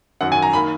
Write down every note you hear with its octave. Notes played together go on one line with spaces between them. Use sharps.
F#2 D#3 F#3 F#5
G#5
A#5
D#3 A#3 B5